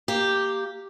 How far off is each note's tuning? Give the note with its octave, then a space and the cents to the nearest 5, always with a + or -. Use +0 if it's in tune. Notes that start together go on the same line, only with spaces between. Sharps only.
A#3 -5 G4 +0